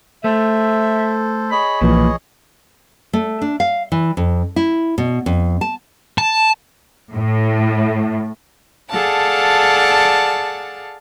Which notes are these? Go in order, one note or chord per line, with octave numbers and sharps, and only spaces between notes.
A3 A4 C5 E5
G#4 C#5 D#5 B5
B1 A#2 E3 F3 B4
A3
D4
F5
E3
F2
E4
B2
F2
A5
A5
A2
G#4 A4 D5 F5 F#5 A5